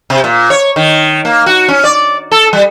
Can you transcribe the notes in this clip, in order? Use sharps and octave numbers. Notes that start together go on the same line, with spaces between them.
C3
A#2
C#5
D#3
A#3
F#4
C#4
D5
A4
G3